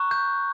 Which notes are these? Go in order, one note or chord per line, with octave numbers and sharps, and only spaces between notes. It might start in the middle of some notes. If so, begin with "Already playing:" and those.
Already playing: A#5 C#6 F#6
G6